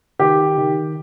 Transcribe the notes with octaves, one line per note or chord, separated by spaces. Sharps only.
D#3 G4
D#3